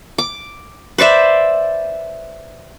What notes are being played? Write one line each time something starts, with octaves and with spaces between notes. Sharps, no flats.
D6
B4 C5 D5 E5